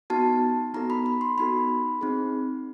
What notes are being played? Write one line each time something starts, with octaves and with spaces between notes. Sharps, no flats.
B3 D#4 F#4 A5
B3 D#4 F#4 A4 A#5
B5
B5
C6
B3 D#4 F#4 A4 B5
C4 D#4 G#4